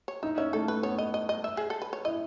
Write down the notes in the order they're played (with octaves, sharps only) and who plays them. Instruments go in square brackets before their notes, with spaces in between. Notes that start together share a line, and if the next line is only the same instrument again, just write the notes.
[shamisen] C#5
[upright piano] D#4 [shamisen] E5
[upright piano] C#4 [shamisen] E5
[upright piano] A3 [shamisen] A4
[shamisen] B4
[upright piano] B3 [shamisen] C#5
[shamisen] D#5
D#5
D#5
E5
G#4
A4
B4
C#5
[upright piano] E4 [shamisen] D#5